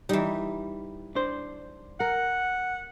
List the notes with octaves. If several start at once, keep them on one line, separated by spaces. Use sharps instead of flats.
E3 G3 D#4 E5
D4 C5
A#4 F#5